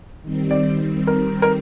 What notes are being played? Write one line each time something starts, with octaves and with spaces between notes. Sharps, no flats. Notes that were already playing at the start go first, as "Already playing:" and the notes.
D#3 G3 C4
D5
A#4
A#4